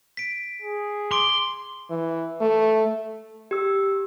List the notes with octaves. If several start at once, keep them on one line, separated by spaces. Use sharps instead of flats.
B6 D7
G#4
C6 D6 D7
E3
A3
G4 E6